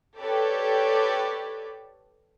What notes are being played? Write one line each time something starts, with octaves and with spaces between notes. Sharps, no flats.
G4 A4 B4 C#5 D5